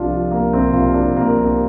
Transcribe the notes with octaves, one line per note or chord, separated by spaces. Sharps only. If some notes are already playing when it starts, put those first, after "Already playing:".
Already playing: C2 F3 D4 F4
F3
F3 A#3
C2 C4
C2 F4
C2 D4
C3 A#3
C2 C4